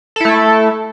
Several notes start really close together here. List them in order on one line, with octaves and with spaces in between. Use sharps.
A4 E4 A3